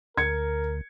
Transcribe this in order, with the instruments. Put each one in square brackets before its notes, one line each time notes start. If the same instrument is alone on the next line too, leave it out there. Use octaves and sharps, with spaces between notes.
[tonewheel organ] D2 [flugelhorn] A#4 [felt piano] G#6 C#7